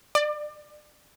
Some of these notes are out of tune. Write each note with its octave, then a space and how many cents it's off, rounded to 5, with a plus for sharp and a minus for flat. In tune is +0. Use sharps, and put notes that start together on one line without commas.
D5 +30